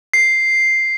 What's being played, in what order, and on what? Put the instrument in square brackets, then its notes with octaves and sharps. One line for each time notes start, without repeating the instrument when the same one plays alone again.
[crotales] C7